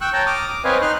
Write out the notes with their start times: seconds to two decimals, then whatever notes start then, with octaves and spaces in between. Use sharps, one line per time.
0.01 G5 C#6 E6 F#6
0.13 C#5 G5 A5 A#5
0.27 D6 D#6 F6
0.46 D6
0.64 C4 B4 C#5 D#5 F5 G#5
0.82 D#4 C6 F6 F#6